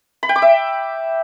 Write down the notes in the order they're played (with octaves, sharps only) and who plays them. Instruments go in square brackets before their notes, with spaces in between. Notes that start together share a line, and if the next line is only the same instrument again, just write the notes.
[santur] B5
G5
D6
E5